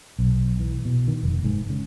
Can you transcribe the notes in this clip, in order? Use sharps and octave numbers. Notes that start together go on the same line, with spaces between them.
B1
E3
B2
D#3
F1
G#2
C#3